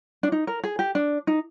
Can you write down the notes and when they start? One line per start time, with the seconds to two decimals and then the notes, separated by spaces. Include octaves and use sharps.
0.23 D4
0.32 D#4
0.47 A#4
0.64 G#4
0.79 G4
0.95 D4
1.27 D#4